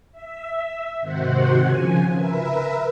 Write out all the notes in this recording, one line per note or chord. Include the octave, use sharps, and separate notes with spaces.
E5
G#2 C3 D#3 F#4 C5 F#5
C#3 F3 G#5
A#4 B4 E5